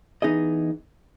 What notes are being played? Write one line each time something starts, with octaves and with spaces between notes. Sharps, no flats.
E3 B3 D#4 G#4 D#5